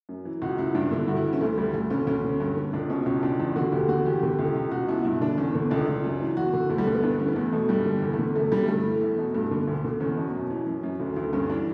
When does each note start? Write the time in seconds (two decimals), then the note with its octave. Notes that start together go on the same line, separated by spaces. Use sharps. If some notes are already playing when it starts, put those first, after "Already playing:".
0.09 F#2
0.25 E3
0.42 C#2 F#4
0.58 C#2 E4
0.75 G2 D4
0.91 D3 E4
1.08 G2 F#4
1.16 E4
1.24 E3
1.33 C#4
1.41 D2 A3
1.58 D2 G3
1.74 D2 A3
1.90 D2 C#4
2.07 D2 C#4
2.24 D3
2.40 G2
2.57 D3
2.73 C#2 D4
2.90 B2 C#4
3.06 C#2 C#4
3.23 C#2 D4
3.39 E2 D4
3.56 D3 F#4
3.72 D2 G4
3.89 D3 F#4
4.06 E2 G4
4.23 D3
4.39 C#2
4.55 C#2
4.71 C#2 F#4
4.88 B2 E4
5.05 G2 E4
5.21 D3 D4
5.38 E2 C#4
5.54 D3 C#4
5.71 C#2 D4
5.87 C#2
6.04 F#2
6.20 E3
6.37 E2 F#4
6.53 D3
6.70 D2 A3
6.78 G3
6.86 D3 A3
6.95 B3
7.03 G2 D4
7.20 E3 C#4
7.28 B3
7.36 E2 A3
7.53 B2 A3
7.69 G2 G3
7.86 D3
8.02 E2
8.13 A3
8.19 D3
8.35 F#2 A3
8.52 D3 G3
8.68 G2 A3
8.85 E3
9.02 E2
9.18 B2
9.34 G2 A3
9.51 D3
9.68 D2
9.84 D3
10.00 E2 C#4
10.17 B2
10.34 F#2
10.50 E3
10.67 F#2
10.83 F#2
11.00 D2
11.16 D2
11.33 G2 C#4
11.49 E3 D4